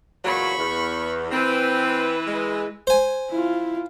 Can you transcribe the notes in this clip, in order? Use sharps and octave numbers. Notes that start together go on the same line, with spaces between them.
E2 A#2 F#3 B5 C#6
E2
E3 C4 B4
G#3
C5 G#5
E4 F4